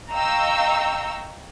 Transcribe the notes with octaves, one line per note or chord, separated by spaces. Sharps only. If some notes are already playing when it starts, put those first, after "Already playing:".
D#5 F5 G5 A#5 C#6 E6